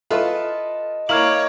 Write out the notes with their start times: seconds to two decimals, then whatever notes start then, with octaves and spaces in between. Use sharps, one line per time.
0.11 F4 A4 B4 D#5 E5 A5 C#6
1.09 A#3 E4 C#5 F5 A#5 D6 F6 F#7